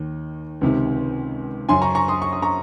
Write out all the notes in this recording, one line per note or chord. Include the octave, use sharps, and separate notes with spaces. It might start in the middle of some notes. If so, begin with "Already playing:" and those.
Already playing: D#2 D#3
C#2 C3 D#3
F#2 C#3 G#5 C6
A#5 C#6
A#5 C#6
C6 D#6
C#6
D#6
A#5 C#6